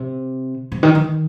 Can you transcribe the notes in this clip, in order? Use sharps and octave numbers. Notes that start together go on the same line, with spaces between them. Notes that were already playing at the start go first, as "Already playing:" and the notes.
Already playing: C3
C3
D#3
D#3